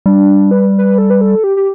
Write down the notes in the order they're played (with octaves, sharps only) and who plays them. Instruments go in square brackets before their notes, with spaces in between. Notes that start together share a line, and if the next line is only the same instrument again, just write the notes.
[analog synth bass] G3 [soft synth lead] D4
[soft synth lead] B4
B4
A4
B4
A4
G4
G4